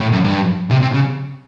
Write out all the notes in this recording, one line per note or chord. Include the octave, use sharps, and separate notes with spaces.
A2
F#2
G2
C3
C3
C#3